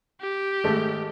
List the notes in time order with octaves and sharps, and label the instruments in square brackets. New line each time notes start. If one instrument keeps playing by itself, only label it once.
[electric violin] G4
[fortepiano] G#1 G#3 A3